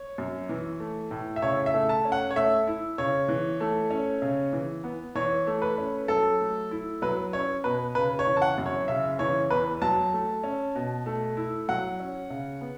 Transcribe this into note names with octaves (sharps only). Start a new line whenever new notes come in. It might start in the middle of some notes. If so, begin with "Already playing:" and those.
Already playing: C#5
F#2
E3
A3
A2
E5
C#3 C#5
E5
A3
A5
C#4
F#5
C#5
A3 E5
E4
C#3 C#5
E3
A3
C#4
C#3
E3
B3
E3 C#5
A3
B4
C#4
F#3 A4
A3
E4
F#3 B4
C#4 C#5
B2 B4
C#3 B4
C#5
E3
A5
F#5
F#2
C#5
C#3 E5
E3 C#5
E2 B4
F#3 A5
A3
C#4
B2
A3
E4
F#3 F#5
C#4
C#3
B3